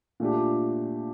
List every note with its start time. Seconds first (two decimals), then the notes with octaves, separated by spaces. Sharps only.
0.20 A#2 A3 D4 G4